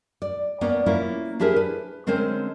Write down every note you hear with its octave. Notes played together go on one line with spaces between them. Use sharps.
D5
A#3 B3 C#4 D5
A#3 C#4 E4 F4
D4 E4 G4 G#4 A#4 C5
B4
D3 G#3 C4 C#4 A#4 C5